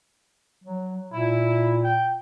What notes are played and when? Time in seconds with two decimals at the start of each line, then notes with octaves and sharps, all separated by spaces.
0.64 F#3
1.13 A#2 E4
1.83 G5